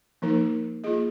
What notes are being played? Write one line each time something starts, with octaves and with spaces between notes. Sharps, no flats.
F3 A#3 D#4 A#4
A#3 F4 G#4 D#5